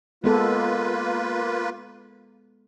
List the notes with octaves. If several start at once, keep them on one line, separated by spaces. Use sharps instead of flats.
G#3 A#3 B3 F4 A4 B4